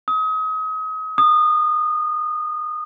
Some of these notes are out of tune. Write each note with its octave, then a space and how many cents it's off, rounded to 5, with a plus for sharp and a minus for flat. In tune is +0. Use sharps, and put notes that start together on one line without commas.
D#6 +35
D#6 -25